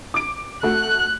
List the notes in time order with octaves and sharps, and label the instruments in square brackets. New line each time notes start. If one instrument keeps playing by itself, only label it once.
[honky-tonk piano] D6 D7
[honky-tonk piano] A3 F#4 [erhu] F#6